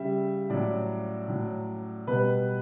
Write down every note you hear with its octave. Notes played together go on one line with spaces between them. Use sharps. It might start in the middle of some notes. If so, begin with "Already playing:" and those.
Already playing: C#3 G3 E5
A2 F#3 D5
A2 F#3
B2 G3 B4